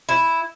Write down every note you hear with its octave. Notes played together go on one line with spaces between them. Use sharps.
E4